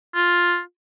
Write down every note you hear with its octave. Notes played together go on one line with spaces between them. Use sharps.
F4